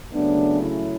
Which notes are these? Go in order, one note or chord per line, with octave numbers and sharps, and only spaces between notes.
C#3 F#3 A3 B3 D4
C#4 E4